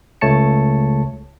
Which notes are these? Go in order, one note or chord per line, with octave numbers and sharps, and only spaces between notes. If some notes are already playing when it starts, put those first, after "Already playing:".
C#2 A3 C#5 A5 C#7